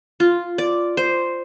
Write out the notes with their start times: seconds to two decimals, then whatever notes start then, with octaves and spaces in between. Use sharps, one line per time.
0.20 F4
0.58 D5
0.97 C5